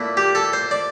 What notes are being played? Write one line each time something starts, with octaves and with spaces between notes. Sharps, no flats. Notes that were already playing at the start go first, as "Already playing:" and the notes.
Already playing: A#2 A3 E4
G4
A4
C5
D5